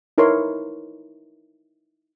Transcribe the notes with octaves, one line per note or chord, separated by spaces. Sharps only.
D#4 E4 A#4 B4 C#5 C6